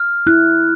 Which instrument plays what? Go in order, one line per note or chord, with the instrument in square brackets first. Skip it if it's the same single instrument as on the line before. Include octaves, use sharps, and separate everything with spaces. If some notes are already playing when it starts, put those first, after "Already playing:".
Already playing: [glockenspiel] F6
[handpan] E4 [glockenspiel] F#6